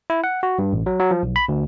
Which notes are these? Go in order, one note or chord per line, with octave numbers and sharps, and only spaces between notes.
E4
F#5
F#4
G2
A1
F#3
F#3
F3
B1
B5
D2